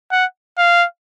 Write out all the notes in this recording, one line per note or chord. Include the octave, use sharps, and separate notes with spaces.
F#5
F5